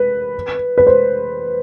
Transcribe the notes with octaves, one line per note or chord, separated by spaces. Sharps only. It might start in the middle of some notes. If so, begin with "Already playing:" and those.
Already playing: B4
B4
C5